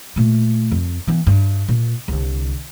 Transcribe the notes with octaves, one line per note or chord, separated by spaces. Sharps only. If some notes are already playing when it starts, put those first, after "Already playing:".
A#2 A3
F2
E3 B3
G2
A#2
C2 D3